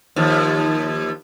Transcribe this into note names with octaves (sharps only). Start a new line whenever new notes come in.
D#2 F3